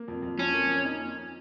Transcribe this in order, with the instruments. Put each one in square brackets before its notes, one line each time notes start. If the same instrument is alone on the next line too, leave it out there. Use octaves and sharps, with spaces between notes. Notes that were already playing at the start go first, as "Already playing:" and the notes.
Already playing: [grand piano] A#3
F2
F2
[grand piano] F3 [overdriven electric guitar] C#4
[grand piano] A#3
F2
D#4